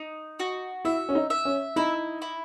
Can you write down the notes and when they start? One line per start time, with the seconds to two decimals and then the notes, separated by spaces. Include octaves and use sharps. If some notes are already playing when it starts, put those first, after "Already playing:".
Already playing: D#4
0.40 F#4
0.85 E4 E5
1.09 C#4
1.15 D#4
1.30 E5
1.45 C#4
1.76 D#4 E4
2.22 E4